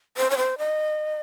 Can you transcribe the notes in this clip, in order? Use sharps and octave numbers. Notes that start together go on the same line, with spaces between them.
C5
C#5
C5
D#5